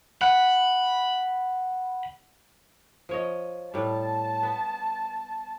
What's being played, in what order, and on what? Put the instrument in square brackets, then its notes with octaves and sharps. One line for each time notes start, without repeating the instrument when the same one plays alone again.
[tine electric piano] F#5 [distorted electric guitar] B5
[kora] F3 C#5 D#5
[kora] A2 G3 [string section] A5
[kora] B3